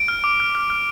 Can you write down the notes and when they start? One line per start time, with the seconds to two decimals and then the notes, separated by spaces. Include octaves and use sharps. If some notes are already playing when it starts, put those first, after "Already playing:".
Already playing: D7
0.08 F6
0.24 D6
0.40 F6
0.55 F6
0.70 F6